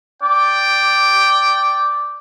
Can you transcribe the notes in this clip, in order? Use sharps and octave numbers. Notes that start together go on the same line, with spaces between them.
D5 G5